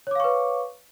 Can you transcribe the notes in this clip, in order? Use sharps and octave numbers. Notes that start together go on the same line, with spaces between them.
B4 C#5 F5 C#6 D6